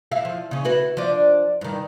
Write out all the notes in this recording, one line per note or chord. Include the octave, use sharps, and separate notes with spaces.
E4 E5 F5
F3
C#3 C#4
E4 F#4 B4
F3 D4
G2 D#3